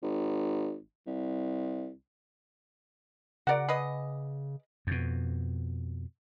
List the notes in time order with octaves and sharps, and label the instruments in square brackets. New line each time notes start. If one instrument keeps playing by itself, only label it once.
[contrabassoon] G#1
C2
[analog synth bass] C#3 [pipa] F#4 A#4 [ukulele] D5 F#5
[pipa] G#4 B4 D#5
[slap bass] F2 B2